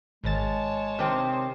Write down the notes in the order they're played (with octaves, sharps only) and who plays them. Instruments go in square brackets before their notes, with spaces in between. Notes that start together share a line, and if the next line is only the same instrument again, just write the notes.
[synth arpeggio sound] G#1 A6 [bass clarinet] G#3 [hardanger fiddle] C#5 A5
[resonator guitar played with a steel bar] C3 D#3 C4